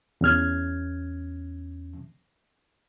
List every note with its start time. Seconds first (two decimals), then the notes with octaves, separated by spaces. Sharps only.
0.21 E2 C#4 F6 G#6